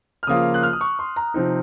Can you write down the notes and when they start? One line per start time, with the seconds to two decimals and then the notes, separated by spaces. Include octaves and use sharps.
0.23 F6
0.27 C#3 F3 A#3 F4 D#6
0.54 F#6
0.63 F6
0.73 D#6
0.81 C#6
0.99 C6
1.16 A#5
1.34 C3 F3 C4 D#4